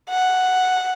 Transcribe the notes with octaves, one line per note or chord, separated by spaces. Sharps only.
F#5